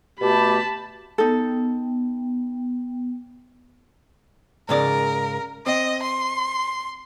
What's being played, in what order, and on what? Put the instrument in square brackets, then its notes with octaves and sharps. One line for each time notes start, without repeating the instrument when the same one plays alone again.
[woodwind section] B2 A3 G4 [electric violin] A5 B5
[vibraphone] B3 G5 [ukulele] D#4 A4
[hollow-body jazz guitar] G#2 C#3 D5 [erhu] A#4
[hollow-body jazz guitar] C4 [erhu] D#5
[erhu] C6